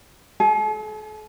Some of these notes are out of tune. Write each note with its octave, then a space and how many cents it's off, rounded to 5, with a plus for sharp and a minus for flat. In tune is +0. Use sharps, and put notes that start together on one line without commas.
A4 -45 G#5 +0